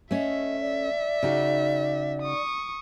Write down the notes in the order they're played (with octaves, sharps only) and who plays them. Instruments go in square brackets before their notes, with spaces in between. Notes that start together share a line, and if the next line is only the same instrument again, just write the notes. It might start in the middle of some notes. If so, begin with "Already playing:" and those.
[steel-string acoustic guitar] A3 C#4 [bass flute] D#5 [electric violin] E5
[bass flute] D5
[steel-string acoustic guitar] C#3 D#4 F#4
[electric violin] C#6 D#6